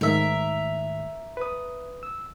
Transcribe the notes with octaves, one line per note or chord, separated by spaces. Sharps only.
G#2 D#3 A3 A#4 E5
B4 D#6
E6